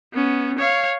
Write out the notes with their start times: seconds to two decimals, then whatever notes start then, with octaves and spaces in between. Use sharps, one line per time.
0.13 B3 C#4
0.59 C#5 F5